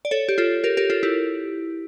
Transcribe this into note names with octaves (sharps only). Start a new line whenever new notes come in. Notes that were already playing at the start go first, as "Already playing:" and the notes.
D5
A4 C#5
G4
F4 A4
G4 A#4
G4 A#4
F4 A4
E4 G4